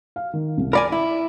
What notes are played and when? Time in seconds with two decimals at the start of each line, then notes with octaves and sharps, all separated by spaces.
0.16 F5
0.33 D#3
0.57 C2
0.73 A#4 D5 G#5 B5
0.92 E4